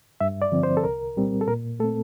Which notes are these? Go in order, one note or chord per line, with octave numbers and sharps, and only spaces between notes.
G2 E5
D5
D3 F3 C4
C5
A4
C2 A#4
A#2 G3 C4
A4
A#2 A#4
A3 C4 A4